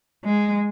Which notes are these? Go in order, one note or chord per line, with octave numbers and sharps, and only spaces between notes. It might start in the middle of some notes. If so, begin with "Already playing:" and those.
G#3